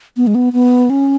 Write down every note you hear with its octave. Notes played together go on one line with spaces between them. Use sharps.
B3
G#3
B3
B3
C#4